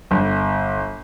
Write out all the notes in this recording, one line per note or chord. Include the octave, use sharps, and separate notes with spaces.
G1